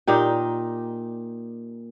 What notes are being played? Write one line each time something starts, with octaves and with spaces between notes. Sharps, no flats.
A#2 D#4 G4